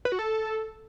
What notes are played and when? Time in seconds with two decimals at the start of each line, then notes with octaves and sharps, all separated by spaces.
0.05 B4
0.12 F#4
0.19 A4